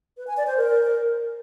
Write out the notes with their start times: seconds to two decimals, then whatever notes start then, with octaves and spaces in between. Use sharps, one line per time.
0.17 B4
0.27 G#5
0.37 D5
0.47 C5
0.57 A#4